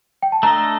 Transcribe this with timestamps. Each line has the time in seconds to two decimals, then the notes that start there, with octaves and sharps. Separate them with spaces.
0.22 G5
0.32 A5
0.43 A3 D4 A4 D#5 A#5